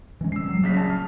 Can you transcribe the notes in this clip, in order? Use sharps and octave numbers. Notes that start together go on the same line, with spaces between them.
E3 G#3 C#4
F3 G3 G#3 E6 C7
F#3 G3
A#1 C#3 B6
A5 D#6
F6